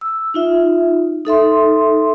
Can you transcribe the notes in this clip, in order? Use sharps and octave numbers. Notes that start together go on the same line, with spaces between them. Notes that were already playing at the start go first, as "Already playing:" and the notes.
E6
D#4 F4 E5
D#4 A4 E5 C6